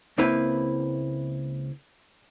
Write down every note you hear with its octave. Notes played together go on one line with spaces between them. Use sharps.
C#2 A#3 C4 E4 B4